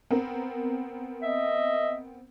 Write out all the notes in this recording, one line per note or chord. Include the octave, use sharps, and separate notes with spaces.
B3 C4 A#4
D#5 E5